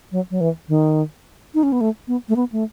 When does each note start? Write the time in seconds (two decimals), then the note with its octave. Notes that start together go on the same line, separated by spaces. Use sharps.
0.12 F#3
0.31 F#3
0.41 E3
0.68 D#3
1.54 D#4
1.63 C#4
1.72 B3
1.81 A3
2.08 B3
2.29 A3
2.36 B3
2.52 A3